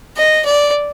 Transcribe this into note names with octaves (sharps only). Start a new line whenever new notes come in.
D#5
D5